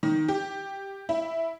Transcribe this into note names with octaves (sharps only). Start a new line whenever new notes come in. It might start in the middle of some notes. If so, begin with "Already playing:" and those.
D#3
G4
E4